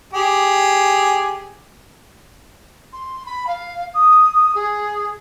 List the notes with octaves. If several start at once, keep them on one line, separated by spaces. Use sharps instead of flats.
G4 G#4
C6
B5
F5
D#6
G#4